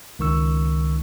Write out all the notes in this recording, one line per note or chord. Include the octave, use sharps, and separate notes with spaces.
C#2 D#3 C#6 E6